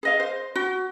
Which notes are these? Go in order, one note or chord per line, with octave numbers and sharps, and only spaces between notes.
G#4 D#5 F5
C5
F#4